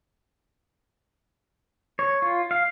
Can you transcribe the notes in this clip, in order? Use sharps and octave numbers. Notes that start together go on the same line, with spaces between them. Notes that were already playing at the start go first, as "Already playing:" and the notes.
C#5
F4
F5